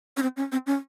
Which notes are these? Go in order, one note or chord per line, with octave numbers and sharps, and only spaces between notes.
C#4
C4
C#4
C4
C#4